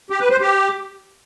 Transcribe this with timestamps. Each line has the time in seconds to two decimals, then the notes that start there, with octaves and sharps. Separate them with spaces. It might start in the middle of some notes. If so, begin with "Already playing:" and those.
0.10 G4
0.20 B4
0.30 C5
0.41 G4